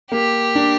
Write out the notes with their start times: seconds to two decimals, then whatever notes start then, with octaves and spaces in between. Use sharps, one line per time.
0.11 A#3 G4
0.55 D4